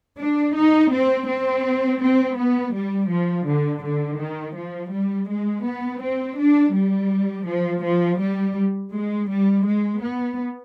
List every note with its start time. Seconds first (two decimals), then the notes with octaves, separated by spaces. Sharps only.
0.20 D4
0.56 D#4
0.93 C4
1.29 C4
2.02 C4
2.38 B3
2.75 G3
3.11 F3
3.47 D3
3.85 D3
4.20 D#3
4.56 F3
4.93 G3
5.29 G#3
5.66 B3
6.03 C4
6.39 D4
6.75 G3
7.47 F3
7.84 F3
8.21 G3
8.93 G#3
9.30 G3
9.66 G#3
10.02 B3